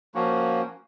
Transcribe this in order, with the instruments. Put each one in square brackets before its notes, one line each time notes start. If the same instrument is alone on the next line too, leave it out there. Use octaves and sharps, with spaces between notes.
[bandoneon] F3 A#3 C#4 F#4